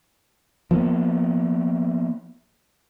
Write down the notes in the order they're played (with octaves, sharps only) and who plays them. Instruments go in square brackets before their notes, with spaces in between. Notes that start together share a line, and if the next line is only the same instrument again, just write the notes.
[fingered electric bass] F3 A#3 B3